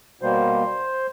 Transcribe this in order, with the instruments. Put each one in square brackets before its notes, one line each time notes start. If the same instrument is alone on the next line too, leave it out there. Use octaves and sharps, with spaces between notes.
[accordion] B2 G3 A#3 C5